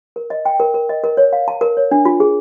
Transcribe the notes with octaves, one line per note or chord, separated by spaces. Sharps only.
A#4
D#5
G5
A#4
A#4
D#5
A#4
C#5
F5
A5
A#4
C#5
D4
F4
G#4